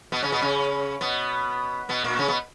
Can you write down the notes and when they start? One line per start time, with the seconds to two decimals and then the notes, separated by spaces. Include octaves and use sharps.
0.12 B2 B3
0.22 C#3 C#4
0.32 B2 B3
0.42 C#3 C#4
1.01 B2 B3
1.89 B2 B3
2.04 A#2 A#3
2.19 C#3 C#4
2.28 B2 B3